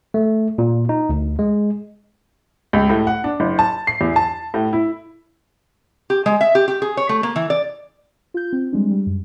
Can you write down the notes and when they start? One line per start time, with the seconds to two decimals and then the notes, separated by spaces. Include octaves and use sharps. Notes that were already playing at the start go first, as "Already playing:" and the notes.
0.14 A3
0.58 A#2
0.89 D#4
1.09 D2
1.39 G#3
2.73 C#2
2.90 A2
3.07 F#5
3.24 D4
3.40 F#1
3.59 A5
3.87 C7
4.01 E2
4.16 A5
4.54 A2
4.73 E4
6.10 G4
6.26 G#3
6.41 E5
6.55 G4
6.68 G4
6.82 G#4
6.97 C#5
7.09 A3
7.23 A#3
7.36 E3
7.50 D5
8.34 F4 G6
8.53 C4
8.73 G3 G#3 C4 D4
8.91 G3
9.07 F#2